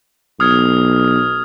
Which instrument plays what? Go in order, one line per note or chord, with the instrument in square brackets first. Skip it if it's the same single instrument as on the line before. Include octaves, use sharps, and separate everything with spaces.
[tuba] B1 [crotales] D#6 F6 G#6